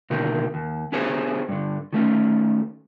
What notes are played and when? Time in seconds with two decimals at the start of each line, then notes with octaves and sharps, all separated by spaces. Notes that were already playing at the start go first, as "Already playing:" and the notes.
0.10 B2 D3 D#3 A#3 G4 A4
0.54 D#2
0.92 B3 D4 G4 G#4 C5 C#5
1.49 G2 D3
1.93 D#3 A3 C#4